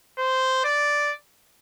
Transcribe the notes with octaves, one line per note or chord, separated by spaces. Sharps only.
C5
D5